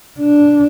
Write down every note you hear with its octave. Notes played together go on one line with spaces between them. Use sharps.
D4